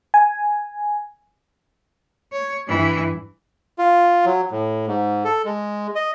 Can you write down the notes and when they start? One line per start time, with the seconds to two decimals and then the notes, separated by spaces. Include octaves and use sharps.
0.14 G#5
2.32 C#5
2.67 G2 E3
3.78 F4
4.25 F#3
4.51 A2
4.87 G#2
5.25 A4
5.45 G#3
5.96 D#5